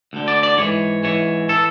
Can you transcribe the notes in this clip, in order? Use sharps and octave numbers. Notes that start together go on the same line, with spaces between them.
D2 D3
D5
D5
G#2 E3 C#5
G#2 E3 C#5
E3 A4